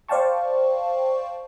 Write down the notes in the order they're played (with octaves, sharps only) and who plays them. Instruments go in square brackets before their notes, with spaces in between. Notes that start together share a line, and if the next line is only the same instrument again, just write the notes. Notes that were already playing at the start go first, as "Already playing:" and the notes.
[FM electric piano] C5 D5 F5 G5 A5 C#6